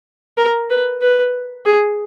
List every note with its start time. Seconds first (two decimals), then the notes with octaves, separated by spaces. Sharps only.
0.37 A#4
0.70 B4
1.01 B4
1.65 G#4